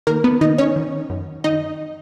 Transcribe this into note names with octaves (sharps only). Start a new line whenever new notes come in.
D#3 A#3 A#4
B3 B4
D#3 D#4 D#5
C#4 C#5
D#3
F#2
D#3 D#4 D#5